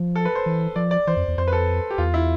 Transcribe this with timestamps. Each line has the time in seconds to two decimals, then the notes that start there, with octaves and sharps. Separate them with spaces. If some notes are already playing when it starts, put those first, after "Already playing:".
Already playing: F3
0.16 A4
0.25 B4
0.35 C5
0.46 E3
0.76 F3 D5
0.91 D5
1.07 E3 C5
1.16 F2
1.28 E2
1.37 F2 C5
1.48 B4
1.53 A4
1.90 G4
1.98 E2 F4
2.14 E4